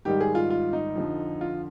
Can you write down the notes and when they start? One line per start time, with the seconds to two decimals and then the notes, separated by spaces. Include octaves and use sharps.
0.05 G#2 D#3 G3 G4
0.20 G#4
0.35 F4
0.50 F4
0.73 D#4
0.95 F2 D3 F3
1.41 F4